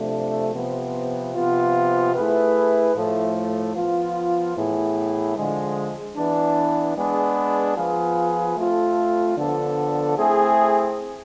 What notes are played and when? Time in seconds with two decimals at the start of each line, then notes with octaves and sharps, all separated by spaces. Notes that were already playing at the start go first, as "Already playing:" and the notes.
Already playing: C3 F3 A3 D4
0.54 C3 F3 B3
1.35 C3 F3 B3 F4
2.15 A3 E4 G#4 B4
2.95 A2 F3 A3
3.75 F3 B3 F4
4.56 A2 E3 B3 E4 G#4
5.36 D3 F3 G#3
6.17 E3 B3 D4
6.96 G#3 B3 D4 G#4 B4
7.76 F3 B3 F4 G#4 B4
8.56 A3 C4 F4 A4
9.37 D3 F3 B3 D4 A4
10.17 A3 C4 E4 G#4